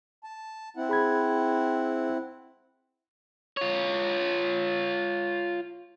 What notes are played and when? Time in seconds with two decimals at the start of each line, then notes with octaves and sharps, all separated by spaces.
0.24 A5
0.77 C4 E4 F#5
0.89 G#4 B5 G#6
3.57 F4 C#5